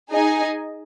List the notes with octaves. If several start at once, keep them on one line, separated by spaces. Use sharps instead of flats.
D#4 G#4 D#5 G#5